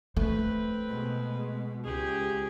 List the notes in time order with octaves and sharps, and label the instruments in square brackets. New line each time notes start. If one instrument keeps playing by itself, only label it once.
[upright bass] A3 [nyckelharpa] C4 B4
[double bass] B2 G#3
[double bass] C#2 [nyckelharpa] G4 G#4